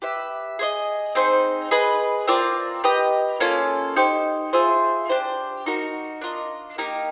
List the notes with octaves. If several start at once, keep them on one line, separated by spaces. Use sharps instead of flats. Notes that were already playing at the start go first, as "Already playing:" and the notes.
G4 B4 E5
G#4 C5 D#5
C4 D#4 G#4 C5
G#4 B4 D#5
C4 F4 A#4 D5
G4 B4 D#5
A#3 C#4 F4 A4
D#4 G4 C5
F4 G#4 C5 E5
D4 G4 C5
D#4 F#4 A#4
D4 F4 A#4 D#5
A#3 D#4 G4 A#4